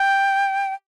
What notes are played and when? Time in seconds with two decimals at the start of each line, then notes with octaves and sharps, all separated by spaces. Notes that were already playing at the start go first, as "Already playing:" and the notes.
Already playing: G5